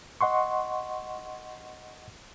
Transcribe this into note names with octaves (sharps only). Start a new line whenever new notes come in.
D#5 F#5 C6 C#6